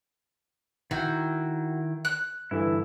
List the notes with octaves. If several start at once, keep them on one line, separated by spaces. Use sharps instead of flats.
D#3 E4 F#4 G5
F#6
G2 D3 E3 E4